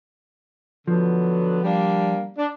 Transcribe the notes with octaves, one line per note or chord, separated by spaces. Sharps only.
D3 F3 F#3 B3
G3 A#3 D4
D4